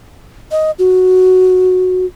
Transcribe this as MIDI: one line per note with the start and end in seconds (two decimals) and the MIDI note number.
0.51 0.71 75
0.79 2.06 66